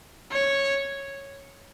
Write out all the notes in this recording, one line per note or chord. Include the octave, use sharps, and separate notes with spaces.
C#5